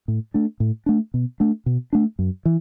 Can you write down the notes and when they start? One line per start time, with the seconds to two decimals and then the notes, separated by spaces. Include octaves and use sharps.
0.08 A2
0.34 A3 D4
0.60 A2
0.86 A3 D4
1.14 B2
1.40 A3 D4
1.66 B2
1.93 A3 D4
2.19 F#2
2.45 E3